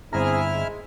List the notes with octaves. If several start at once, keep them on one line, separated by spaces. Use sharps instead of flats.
G1 C4 E4 G#4 E5 A#5 F6
G#3